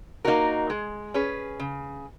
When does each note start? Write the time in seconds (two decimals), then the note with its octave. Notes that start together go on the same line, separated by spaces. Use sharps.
0.25 A#3 D#4 F#4 A#4
0.70 G#3
1.14 C#4 G#4 B4
1.60 C#3